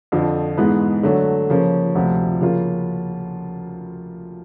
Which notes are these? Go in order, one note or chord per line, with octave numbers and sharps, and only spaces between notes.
F2 D3 F3
G#2 E3 G#3 B3
D3 F#3 A3
C#3 F3 A#3 C#4
D2 C3 F3
C#3 F3 A#3 C#4 F4